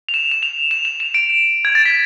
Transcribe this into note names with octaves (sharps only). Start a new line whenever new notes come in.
F7
E7
E7
F7
E7
F7
E7
D7
G#6
A6
B6